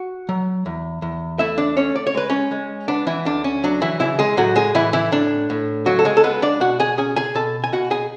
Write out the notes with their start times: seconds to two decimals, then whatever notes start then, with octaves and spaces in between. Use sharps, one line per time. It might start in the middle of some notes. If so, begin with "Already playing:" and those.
Already playing: F#4
0.29 F#3
0.66 E2
1.02 E2
1.39 A3 E4 E5
1.58 D4 D5
1.77 A3 C#4 C#5
1.96 D5
2.07 C#5
2.15 G#3 B4
2.30 C#4 C#5
2.52 G#3
2.88 B3 D4
3.07 E3 E4
3.25 D2 D4
3.44 C#4
3.64 F#3 D4
3.82 E3 E4
4.00 C#3 E3 E4
4.19 G#3 G#4
4.37 A2 F#3 F#4
4.56 G#3 G#4
4.75 A2 E3 E4
4.93 E3 E4
5.12 A2 D4
5.50 A2
5.86 C#2 F#3 F#4
5.99 A4
6.05 G#3 G#4
6.17 A4
6.23 G#3 B3 B4
6.42 D4 D5
6.61 B2 F#4 F#5
6.80 G#4 G#5
6.97 C#4 G#4 G#5
7.16 G#4 G#5
7.35 B2 A4 A5
7.64 G#5
7.72 B2 F#4 F#5
7.91 G#4 G#5